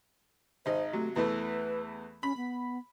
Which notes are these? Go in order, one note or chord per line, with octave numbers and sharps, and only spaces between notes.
G#1 D#4 C5
C3 F#3 A3
E2 E3 A3 B4
C#4 B5
B3